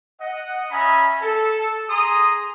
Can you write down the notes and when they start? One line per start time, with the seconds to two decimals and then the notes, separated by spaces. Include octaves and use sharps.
0.20 D#5 F#5
0.71 C#4 D#5 E5 G#5 A#5 B5
1.22 A4
1.89 G#4 A#5 C6 D#6